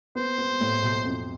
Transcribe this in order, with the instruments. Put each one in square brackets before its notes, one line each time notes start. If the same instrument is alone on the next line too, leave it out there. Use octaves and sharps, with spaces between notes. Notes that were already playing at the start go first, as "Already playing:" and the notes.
[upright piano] B3 [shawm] C5
[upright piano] B3
A2
B1
F2